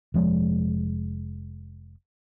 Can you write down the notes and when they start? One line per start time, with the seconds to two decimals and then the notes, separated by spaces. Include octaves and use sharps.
0.14 F1 F3 G#3